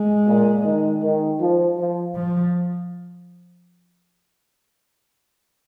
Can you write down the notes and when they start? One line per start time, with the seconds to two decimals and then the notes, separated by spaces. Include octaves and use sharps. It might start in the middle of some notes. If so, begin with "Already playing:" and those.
Already playing: G#3
0.27 A#2
0.64 D#3
1.03 D#3
1.40 F3
1.77 F3
2.15 F3